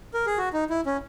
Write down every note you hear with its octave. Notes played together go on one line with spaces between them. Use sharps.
A#4
G#4
F#4
D#4
E4
C#4